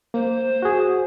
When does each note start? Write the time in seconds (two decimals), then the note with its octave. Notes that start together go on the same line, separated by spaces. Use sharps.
0.14 A#3 C5
0.62 F#4 G#4